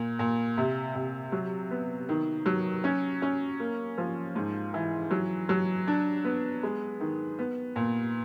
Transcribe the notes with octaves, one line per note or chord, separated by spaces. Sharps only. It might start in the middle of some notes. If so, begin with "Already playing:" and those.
Already playing: A#2
A#2
C3
C3
F#3
B3
D#3
F#3
C#4
C#4
A#3
F3
G#2
E3
F#3
F#3
D4
B3
G#3
D#3
B3
A#2